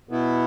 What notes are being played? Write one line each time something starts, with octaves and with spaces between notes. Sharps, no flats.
B2 B3 E4